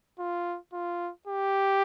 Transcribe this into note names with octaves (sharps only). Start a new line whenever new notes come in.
F4
F4
G4